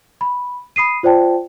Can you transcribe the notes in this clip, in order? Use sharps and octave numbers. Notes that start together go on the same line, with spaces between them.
B5
B5 D#6 C7 D#7
F4 C5 D5 G5 A5